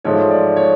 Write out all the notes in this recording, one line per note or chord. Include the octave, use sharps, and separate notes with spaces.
G#2 F3 A3 C#5
D5
C#5